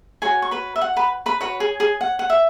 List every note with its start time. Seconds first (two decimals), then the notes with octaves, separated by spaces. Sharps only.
0.22 F#4 G#4 C#5 G#5
0.42 C#6
0.51 B4 B5
0.76 E5
0.81 F#5
0.97 B4 B5
1.26 B4 B5
1.41 F#4 B4 C#5 B5
1.60 G#4 G#5
1.80 G#4 G#5
2.01 F#5
2.19 F#5
2.30 E5